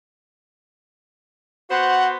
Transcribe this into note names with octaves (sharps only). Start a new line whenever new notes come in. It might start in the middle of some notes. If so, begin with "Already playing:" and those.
B3 F#4 C5 F#5